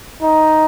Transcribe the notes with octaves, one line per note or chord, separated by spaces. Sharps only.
D#4